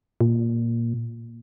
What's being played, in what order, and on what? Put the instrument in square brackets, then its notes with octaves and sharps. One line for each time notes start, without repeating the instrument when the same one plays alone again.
[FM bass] A#2